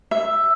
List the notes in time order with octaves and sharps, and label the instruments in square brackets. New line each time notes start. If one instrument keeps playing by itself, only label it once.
[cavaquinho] E5